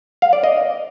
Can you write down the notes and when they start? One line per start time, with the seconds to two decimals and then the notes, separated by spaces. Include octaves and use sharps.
0.22 F5
0.33 D5
0.44 D#5